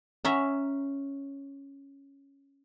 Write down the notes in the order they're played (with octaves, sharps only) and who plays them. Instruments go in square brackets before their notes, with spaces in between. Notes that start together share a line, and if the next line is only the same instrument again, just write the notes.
[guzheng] C#4 E5 A#5